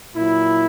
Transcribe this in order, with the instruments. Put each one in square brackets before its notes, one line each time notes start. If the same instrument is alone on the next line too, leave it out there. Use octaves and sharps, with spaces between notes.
[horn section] A#2 F#3 E4